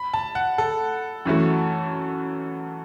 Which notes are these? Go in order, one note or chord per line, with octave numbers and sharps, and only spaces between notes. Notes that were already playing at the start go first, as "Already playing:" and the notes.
Already playing: B5
A5
F#5
A4
F#2 E3 A3 F#4